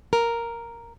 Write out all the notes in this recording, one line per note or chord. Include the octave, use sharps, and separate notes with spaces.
A#4